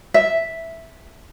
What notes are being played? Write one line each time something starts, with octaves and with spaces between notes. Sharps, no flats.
E5